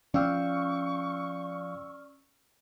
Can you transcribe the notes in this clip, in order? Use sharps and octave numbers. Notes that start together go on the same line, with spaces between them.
F3 C#4 D5 F5 G5 C#6 E6 F6